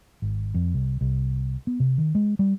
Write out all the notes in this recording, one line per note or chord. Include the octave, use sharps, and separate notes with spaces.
G#1
F2
C2
C2
B3
C3
D#3
G#3
G3